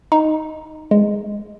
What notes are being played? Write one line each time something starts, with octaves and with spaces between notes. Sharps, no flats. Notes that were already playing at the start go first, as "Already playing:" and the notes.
D#4
G#3